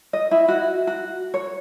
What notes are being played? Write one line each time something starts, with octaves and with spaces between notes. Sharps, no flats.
D#5
E4
F#4
F#4
C#5